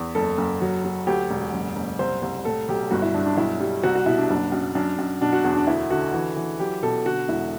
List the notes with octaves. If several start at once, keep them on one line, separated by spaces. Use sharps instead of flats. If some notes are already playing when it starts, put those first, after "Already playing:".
Already playing: E2
F#1 A4
F#1
F#3
F#3
D2 G4
E1
F#1
F#1
C2 C5
C2
A2 A4
B1 G4
G1 F#4
E4
G2 D4
D4
B1 E4
G3
C2 F#4
F#4
B2 E4
D4
F#1 D4
F#2
F#2 D4
F#2
B2 D4
F#4
E2 D4
D4
D2 E4
D3 F#4
E3
E3
F#3 G4
B2 A4
D3 F#4
E1 E4